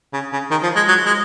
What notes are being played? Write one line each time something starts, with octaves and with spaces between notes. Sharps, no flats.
C#3
C#3
D#3
F3
G#3
F#3
G#3